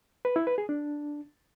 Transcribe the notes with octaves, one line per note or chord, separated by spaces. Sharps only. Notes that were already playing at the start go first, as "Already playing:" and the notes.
B4
E4
B4
G#4
D4